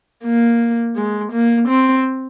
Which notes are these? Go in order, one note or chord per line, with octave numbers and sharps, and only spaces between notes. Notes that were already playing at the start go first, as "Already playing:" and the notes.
A#3
G#3
A#3
C4